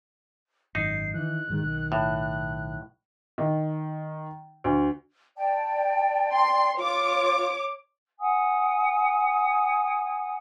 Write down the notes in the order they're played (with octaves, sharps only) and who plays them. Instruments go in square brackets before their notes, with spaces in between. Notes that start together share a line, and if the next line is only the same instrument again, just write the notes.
[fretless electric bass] G#1 F#2 [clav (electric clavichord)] D#4 [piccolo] C7
[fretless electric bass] D#3 E3 [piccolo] F#6
[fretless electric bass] G#2 D#3 G#3
B1 D#3
[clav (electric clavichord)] A2
[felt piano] D#3
D2
[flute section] D5 G5 A5
[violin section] C6
[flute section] F4 [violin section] C#5 D6
[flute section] F#5 G#5 D#6